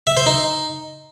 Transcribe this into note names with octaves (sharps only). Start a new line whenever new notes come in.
E5
C5
D#4